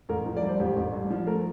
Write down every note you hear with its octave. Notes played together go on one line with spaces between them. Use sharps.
A1 A#4
F3
D5
G2
C5
A1 G4
A1
G2
F3
A3 A#4